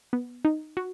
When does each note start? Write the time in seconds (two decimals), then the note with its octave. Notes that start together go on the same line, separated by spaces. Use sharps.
0.13 B3
0.45 D#4
0.77 F#4